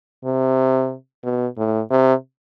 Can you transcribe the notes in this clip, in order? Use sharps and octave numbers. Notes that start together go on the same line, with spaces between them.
C3
B2
A2
C3